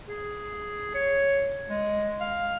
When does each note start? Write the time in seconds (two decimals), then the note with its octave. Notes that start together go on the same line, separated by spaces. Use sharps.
0.07 G#4
0.95 C#5
1.69 G#3
2.20 F5